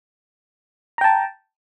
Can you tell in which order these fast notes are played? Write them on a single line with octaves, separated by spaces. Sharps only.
A#5 G5 A5